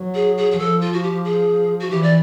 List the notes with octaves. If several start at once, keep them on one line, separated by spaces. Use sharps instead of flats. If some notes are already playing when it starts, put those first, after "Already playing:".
Already playing: F#3
G#4
G#4
G#4
F3 A4
F4
F#4
G4
G#4
F#4
E3 G4
D5